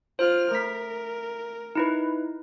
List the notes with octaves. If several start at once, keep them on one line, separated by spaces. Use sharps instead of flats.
F4 C5 F6
A3 A#4 B6
D#4 E4 B4